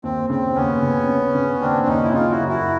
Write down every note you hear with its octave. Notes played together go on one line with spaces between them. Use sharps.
D#2 C4
C#3 C4
D#2 B3 C#4
C#3
C#3
C#3
D#2 C4 D4
D#2 C#4 D#4
E4
C#3 D#4 F4
E4 F#4
F#2
E4 F#4